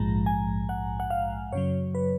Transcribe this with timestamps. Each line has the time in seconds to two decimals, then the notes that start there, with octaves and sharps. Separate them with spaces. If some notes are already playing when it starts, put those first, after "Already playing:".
Already playing: A#1 G#2 F3 G#3 A#5
0.26 G#5
0.69 F#5
1.00 F#5
1.10 F5
1.53 F#2 C#3 F#3 C#5
1.95 B4